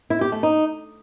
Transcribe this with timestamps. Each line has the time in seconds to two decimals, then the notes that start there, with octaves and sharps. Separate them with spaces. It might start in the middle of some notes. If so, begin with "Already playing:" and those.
0.10 E4
0.21 G4
0.32 A3
0.43 D#4